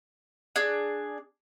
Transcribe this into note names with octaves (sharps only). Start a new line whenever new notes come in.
D4 G#4